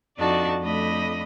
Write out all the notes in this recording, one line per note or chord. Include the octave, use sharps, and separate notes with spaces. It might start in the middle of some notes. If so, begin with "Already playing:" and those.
F2 D4 D#4 F#4 D5 A5
F2 A3 D4 D#5 B5